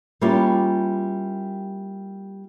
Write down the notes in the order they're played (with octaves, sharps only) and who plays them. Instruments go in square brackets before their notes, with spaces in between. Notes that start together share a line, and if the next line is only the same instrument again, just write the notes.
[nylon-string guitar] G3 A#3 C#4 E4 F4 G4